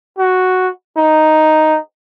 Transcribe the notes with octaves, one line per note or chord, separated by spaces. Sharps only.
F#4
D#4